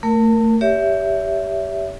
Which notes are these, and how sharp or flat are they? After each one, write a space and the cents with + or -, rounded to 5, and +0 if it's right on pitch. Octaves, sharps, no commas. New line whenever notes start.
A3 +30 A#4 +0
G4 +0 C#5 +35 E5 +5